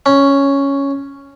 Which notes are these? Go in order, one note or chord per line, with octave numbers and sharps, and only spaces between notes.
C#4